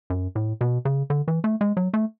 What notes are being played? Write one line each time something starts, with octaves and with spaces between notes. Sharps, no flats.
F#2
A2
B2
C#3
D3
E3
A3
G#3
F#3
A3